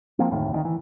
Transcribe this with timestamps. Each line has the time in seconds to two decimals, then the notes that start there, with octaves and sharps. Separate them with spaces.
0.19 F3 A#3 C4
0.31 F1 D2 A2 D#3
0.51 D2 G#2 D#3
0.65 E3